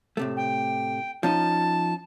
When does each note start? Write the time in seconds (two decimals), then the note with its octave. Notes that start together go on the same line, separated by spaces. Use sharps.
0.17 A2 C3 A3
0.37 G5
1.23 F3 C#4 D#4 A5